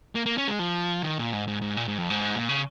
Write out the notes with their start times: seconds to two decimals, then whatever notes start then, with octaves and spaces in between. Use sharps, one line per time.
0.15 A#3
0.26 A#3
0.38 C#4
0.48 G#3
0.59 F3
1.03 D#3
1.18 A#2
1.33 G#2
1.48 G#2
1.62 G#2
1.77 A#2
1.88 G#2
1.98 F2
2.10 G#2
2.36 A#2
2.49 C#3